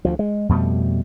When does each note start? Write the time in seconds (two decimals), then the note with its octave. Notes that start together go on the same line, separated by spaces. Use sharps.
0.05 D2 F3
0.19 G#3
0.49 F2 B2 G3 A3